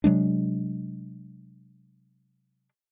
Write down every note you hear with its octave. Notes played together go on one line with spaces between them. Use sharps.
C3 F#3 G#3 D4